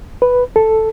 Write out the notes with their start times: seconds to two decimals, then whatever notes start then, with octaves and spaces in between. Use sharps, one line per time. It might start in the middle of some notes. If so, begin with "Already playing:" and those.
0.22 B4
0.56 A4